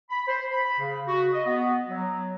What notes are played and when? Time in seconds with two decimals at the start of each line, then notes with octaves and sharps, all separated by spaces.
0.10 B5
0.27 C5
0.51 B5
0.79 C#3
1.07 F#4
1.32 D#5
1.45 B3
1.88 F#3